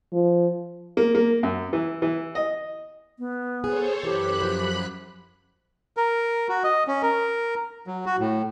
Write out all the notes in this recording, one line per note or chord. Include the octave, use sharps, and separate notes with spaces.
F3
A#3
A#3
F#2
E3
E3
D#5
B3
G#4 A4 C5 C#5
F#2 E3 G4 B5 F#6
F3
A#4
F#4
D#5
C#4
A#4
F#3
F#4
A2